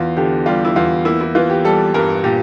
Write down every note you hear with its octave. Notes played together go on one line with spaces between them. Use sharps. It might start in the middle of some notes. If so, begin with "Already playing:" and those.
Already playing: E2 F4
D3 G4
G3 F4
E4
E2 F4
A#3 E4
E4
E3 F4
G4
G3 A4
G2 A#4
A#2 G4